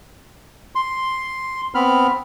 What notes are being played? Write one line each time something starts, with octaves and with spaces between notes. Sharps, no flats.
C6
B3 C4 B5 F6